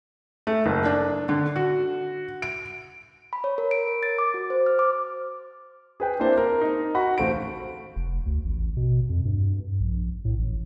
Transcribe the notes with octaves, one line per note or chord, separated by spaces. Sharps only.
A3
F#1
D4
D3
F#4
D7
B5
C#5
A#4
D7
A#4
A6
D6
F#4
C5
F6
D6
G#4 B4 G5
A#3 C4 D4 E4 C5
A#4
D#4
F#4 F#5 B5
A1 A3 C5 F5 D7
F1
D2
A1
B2
F2
G2
A#1
A2
A1